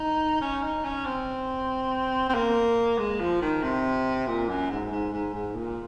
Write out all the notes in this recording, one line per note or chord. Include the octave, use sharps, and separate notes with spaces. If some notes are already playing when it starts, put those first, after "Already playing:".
Already playing: D#4
C#4
D#4
C#4
C4
C4
A#3
G#3
F3
D#3
C3
A#2
F#2
G#2
G#2
G#2
G#2
A#2